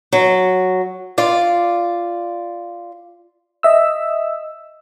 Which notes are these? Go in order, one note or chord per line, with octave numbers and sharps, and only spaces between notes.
F#3
F4 D5
D#5 E5 E6